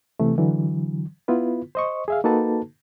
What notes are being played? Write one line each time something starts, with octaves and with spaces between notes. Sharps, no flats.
C3 E3 A3
D3 E3 F#3
B3 E4 F4 B4
C5 D#5 C#6
G#4 E5 F5
A#3 D#4 F#4 A4 B4 A5